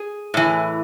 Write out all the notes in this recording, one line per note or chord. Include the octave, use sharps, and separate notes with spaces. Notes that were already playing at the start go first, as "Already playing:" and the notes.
Already playing: G#4
A2 E3